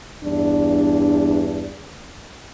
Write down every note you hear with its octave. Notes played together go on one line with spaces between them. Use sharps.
E2 G2 D4